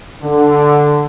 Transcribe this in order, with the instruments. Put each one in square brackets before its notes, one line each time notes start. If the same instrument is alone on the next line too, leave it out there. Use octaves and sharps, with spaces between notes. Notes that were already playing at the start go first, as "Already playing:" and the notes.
[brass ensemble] D3